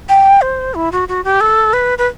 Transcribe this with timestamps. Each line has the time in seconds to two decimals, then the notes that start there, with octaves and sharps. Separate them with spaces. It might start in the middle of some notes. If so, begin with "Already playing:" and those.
0.09 G5
0.41 C5
0.74 E4
0.92 F#4
1.08 F#4
1.24 G4
1.41 A4
1.73 B4
1.98 B4